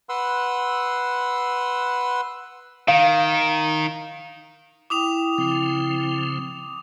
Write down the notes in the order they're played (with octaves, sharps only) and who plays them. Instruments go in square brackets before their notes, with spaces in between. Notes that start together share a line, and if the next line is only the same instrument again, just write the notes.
[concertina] B4 F#5 C6 E6
[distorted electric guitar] D#3 [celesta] F5
[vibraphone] E4 G5 [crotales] D6 D#6 F7
[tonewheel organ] C#3 F3 C4